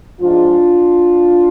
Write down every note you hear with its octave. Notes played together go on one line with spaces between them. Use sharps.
G#2 F3 G#3 D4 F4